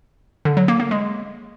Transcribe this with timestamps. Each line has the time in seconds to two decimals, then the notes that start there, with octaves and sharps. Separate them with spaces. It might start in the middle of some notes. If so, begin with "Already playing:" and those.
0.45 D3
0.57 F#3
0.68 A#3
0.80 A#3
0.91 G#3